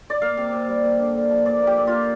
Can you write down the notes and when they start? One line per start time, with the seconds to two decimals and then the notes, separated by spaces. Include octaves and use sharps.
0.10 D5
0.22 A#3 F5
0.37 C3
0.53 C3
0.68 G3
0.84 A#3
0.99 D3
1.15 D3
1.30 F3
1.46 A#2 D5
1.62 A#3
1.67 G4
1.77 A#2
1.87 A#3 F4